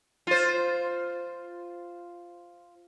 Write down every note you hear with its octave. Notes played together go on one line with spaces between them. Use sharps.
F4 C5